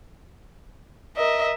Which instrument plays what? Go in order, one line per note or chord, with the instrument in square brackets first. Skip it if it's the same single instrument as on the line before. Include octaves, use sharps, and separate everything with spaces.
[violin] A#4 E5 [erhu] D#5